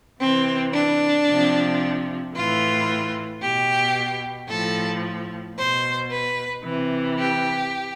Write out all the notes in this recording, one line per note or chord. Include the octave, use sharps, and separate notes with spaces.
C3 E3 C4
D4
C3 F3
A2 E3 F4
B2 G4
A2 F3 A4
B2 C5
B4
C3 E3
G4